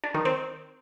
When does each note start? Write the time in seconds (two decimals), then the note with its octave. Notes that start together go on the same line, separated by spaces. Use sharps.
0.04 D4
0.14 D#3
0.25 C4